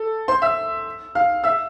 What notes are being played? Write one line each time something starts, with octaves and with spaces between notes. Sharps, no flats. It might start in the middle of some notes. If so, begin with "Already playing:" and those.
Already playing: A4
C5 C6
E5 E6
F5 F6
E5 E6